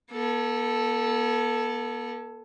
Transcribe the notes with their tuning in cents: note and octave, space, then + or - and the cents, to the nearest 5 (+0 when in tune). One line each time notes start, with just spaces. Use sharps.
B3 -45 A4 +0